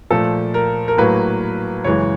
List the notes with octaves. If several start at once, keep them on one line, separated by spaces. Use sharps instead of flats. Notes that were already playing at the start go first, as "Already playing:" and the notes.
A#2 F3 A3 A4
A#4
A#4
A2 F#3 A#3 B4
F#2 C#3 E3 G#3 C#5